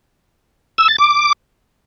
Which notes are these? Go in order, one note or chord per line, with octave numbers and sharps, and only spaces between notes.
E6
A6
D6